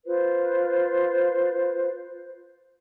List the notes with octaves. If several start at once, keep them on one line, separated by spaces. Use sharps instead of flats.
F4 B4 C5